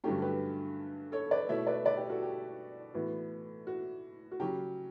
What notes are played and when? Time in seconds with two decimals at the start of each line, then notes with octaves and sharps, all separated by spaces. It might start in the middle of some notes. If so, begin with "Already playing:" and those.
0.04 G2 D3 F#3 A3 C#4 G4
0.22 G4 B4
1.12 A4 C#5
1.31 B4 D5
1.49 B2 A3 E4 C#5 E5
1.67 B4 D5
1.85 B4 D5
1.97 G4
2.09 F#4 A4
2.22 G4
2.94 A2 E3 B3 F#4
3.67 F#4
4.32 F#4
4.40 C#3 F#3 C#4 G4